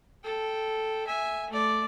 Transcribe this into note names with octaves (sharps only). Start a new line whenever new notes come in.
A4 G5
E5 G#5
A3 D5